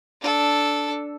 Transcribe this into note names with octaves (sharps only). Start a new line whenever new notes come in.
D4 A4